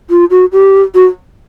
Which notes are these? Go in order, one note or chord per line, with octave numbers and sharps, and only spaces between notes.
F4
F#4
G4
F#4